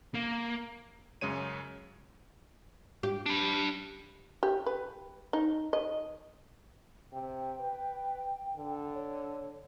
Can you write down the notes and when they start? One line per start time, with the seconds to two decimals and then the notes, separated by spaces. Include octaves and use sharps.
0.14 A#3
1.21 F#2 C#3 G#3 C#5 D#7
3.03 G4
3.26 D4 B5
4.43 G4
4.66 B4
5.33 D#4
5.73 D#5
7.13 C3 G5
7.60 B4
8.56 D3
8.95 C#5